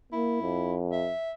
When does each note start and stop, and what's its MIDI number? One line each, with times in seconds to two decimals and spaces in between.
0.13 0.39 58
0.13 0.76 64
0.42 1.12 41
0.92 1.32 76